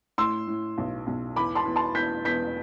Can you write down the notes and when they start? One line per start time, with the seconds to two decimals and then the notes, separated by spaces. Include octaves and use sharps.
0.18 A2 C6 E6
0.47 A2
0.78 B1
1.07 B1
1.36 E2 B5 D6
1.55 A5 C6
1.65 E2
1.76 A5 C6
1.95 E2 G6 B6
2.25 E2 G6 B6